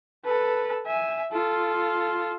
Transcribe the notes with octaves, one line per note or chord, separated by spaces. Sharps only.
A4 B4
E5 G#5
F4 A4